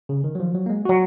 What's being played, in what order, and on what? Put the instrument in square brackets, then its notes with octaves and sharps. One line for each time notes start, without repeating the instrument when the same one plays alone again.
[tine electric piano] C#3
D#3
F#3
F3
F#3
A#3
G#3
[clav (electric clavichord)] F#3 [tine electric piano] F#4